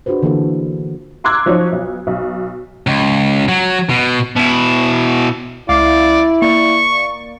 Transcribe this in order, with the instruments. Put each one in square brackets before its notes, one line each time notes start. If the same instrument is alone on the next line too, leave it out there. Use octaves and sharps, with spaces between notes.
[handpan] D4 F4 F#4 G#4 B4 C5
D3 E3 A#3 F4 A4
[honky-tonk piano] A#5 C6 D6 E6 F#6 G#6
F3 F#3 D#4 C#5
B1
B1
[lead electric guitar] C#2
F#3
B2
[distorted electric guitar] B2 E4
[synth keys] C#2 F5 D6 [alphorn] E4 [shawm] D5
[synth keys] A#3 D5 [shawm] C#6